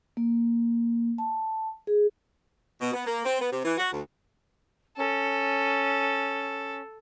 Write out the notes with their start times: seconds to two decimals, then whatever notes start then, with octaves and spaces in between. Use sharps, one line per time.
0.17 A#3
1.18 A5
1.87 G#4
2.81 B2
2.94 B3
3.06 A#3
3.25 C4
3.40 B3
3.52 C3
3.65 E3
3.78 F#4
3.92 D2
4.97 C#4 A4